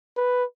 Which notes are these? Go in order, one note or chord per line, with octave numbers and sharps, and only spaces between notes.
B4